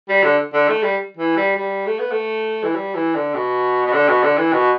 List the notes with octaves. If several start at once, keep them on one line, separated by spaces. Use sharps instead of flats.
G3
D3
D3
A3
G3
E3
G3
G3
A3
B3
A3
E3
G3
E3
D3
B2
B2
D3
B2
D3
E3
B2